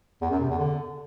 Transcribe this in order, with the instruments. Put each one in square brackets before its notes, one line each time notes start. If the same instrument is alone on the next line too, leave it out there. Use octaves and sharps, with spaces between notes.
[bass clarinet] E2
F#2
C3
E2
D3